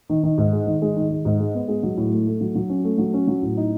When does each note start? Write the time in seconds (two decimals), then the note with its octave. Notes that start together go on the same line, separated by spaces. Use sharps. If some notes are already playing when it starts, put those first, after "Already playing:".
0.09 D#3
0.23 D#3
0.38 G#2
0.53 G#3
0.67 D#3
0.82 G#3
0.96 D#3
1.10 D#3
1.25 G#2
1.40 G#3
1.55 B3
1.68 G#3
1.83 F#3
1.97 A2
2.12 A3
2.26 A3
2.41 F#3
2.55 F#3
2.69 C#4
2.84 A3
2.98 F#3
3.14 C#4
3.28 F#3
3.42 A2
3.57 D#4